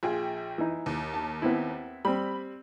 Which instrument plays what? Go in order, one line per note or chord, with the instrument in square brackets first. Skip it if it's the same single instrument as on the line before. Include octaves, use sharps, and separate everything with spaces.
[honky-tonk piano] A#1 G#4 G5 [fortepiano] F4
[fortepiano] E3 D#4
[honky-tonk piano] D#2
[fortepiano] A5
B3 C4 E4
[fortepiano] G3 C4 [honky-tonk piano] B5